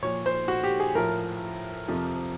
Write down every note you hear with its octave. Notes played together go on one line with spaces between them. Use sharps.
A#2 F3 C#5
C5
F#4
G4
G#4
A2 F3 A#4
F2 C3 F3